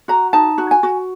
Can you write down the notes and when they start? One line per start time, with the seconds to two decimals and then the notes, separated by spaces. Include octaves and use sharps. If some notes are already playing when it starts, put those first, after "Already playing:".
0.08 F#4 A#5
0.33 D#4 A5
0.58 F#4
0.71 G#5
0.83 F#4